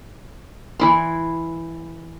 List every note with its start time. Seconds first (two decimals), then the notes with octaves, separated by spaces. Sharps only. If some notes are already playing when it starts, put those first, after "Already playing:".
0.80 E3 E4 C6